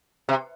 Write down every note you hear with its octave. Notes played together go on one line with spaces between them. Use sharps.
C3